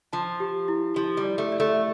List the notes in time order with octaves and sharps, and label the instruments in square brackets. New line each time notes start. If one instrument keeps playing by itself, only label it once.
[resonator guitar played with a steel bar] F3 [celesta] A5
[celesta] G4
E4
[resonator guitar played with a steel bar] F3 [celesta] G4
[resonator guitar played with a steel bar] G3
[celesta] D5
[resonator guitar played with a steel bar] A3
[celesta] D5
[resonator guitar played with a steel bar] A3